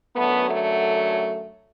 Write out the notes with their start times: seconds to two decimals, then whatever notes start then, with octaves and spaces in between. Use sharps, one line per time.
0.15 F#2 D3 F#3 A3 B3
0.48 A3